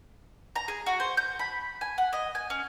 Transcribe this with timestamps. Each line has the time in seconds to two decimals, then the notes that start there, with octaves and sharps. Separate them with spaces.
0.56 A#5
0.68 G#4
0.86 F#4
1.00 C5
1.17 G6
1.39 B5
1.81 G#5
1.98 F#5
2.13 D#5
2.35 G#5
2.50 C#4